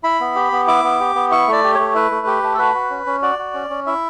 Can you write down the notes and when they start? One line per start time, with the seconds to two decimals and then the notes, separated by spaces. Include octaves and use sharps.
0.04 E4 B5
0.21 B3
0.35 G4
0.52 B3
0.68 E4 D6
0.84 B3
1.00 G4
1.15 B3
1.31 E4 C#6
1.48 A3 D5
1.64 G4
1.75 A3 C#5
1.95 E4 B4
2.11 A3
2.27 G4
2.43 A3
2.54 A4
2.58 F#4 B4
2.75 F#4
2.90 C#4
3.06 C#4
3.22 F#4 D5
3.39 F#4
3.54 C#4
3.70 C#4
3.87 E4 E5